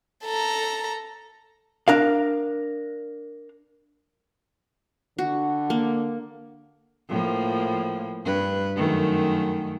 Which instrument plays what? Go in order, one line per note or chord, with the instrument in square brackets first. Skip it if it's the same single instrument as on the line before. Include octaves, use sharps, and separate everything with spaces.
[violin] A4 A#5
[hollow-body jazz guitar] D4 A#4 F5
[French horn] D3 [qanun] F#4
[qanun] A#3
[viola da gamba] A2 F3 A#3
G2 B4
F#2 D#3 A3